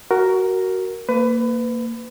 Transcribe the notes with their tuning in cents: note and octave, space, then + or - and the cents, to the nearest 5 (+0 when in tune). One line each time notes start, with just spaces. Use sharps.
F#4 +15 A#4 +0
A#3 -15 B4 +25